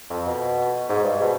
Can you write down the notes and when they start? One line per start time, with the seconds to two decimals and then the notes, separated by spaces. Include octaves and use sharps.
0.10 F2
0.26 B2
0.89 G#2
1.04 G2
1.21 B2